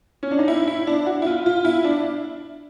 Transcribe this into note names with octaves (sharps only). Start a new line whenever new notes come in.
C#4
D4
D#4
E4
E4
D4
F#4
E4
F4
F4
E4
D4